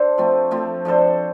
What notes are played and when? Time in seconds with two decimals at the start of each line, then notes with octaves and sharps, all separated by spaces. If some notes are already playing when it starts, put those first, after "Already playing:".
Already playing: D4 A4 C5
0.18 F3 A3 C4
0.51 F3 A3 C4
0.85 F3 D4 A4 C5